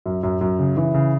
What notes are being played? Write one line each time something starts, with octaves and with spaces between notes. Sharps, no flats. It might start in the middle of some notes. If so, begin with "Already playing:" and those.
F#2
F#2
F#2
C#3
E3
C#3